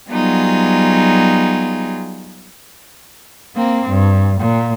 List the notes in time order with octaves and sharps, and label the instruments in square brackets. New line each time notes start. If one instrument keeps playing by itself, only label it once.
[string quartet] F#3 G3 B3 D#4 F4 G#4
[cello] A#3 C4
G2
A#2